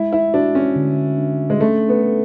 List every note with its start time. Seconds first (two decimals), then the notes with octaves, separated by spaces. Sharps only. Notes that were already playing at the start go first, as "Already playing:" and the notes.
Already playing: G#3 E4
0.12 E4
0.34 D4 F#4
0.55 C#4
0.76 D3
1.18 D4
1.50 G#3
1.61 A3 C#4
1.89 B3
2.03 A4